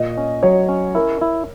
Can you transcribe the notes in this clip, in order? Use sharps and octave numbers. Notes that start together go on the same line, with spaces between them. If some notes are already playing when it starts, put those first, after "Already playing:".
Already playing: A#2 D#5
C#4
F#3 C#5
C#4
E4 A#4
E4